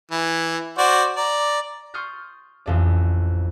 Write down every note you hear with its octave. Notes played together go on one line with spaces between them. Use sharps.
E3
F#4 C5 D5
D5 A#5
C6 C#6 D#6 F6 G6 A6
A1 F2 D5